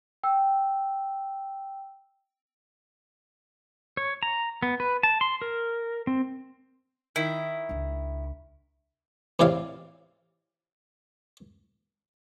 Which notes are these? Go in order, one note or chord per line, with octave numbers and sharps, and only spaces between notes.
G5 E6
C#5
A#5
B3
B4
A5
C6
A#4
C4
D#3 E4
C#2 D4
E2 A2 C3 D5 F5